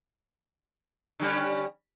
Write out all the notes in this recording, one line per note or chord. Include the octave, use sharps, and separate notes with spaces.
D3 G3 C#4